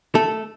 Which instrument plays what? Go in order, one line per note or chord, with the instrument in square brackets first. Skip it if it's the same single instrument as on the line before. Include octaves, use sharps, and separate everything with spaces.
[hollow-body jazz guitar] A3 A4